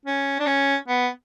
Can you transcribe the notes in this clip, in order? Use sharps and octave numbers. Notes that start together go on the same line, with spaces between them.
C#4
D4
C#4
B3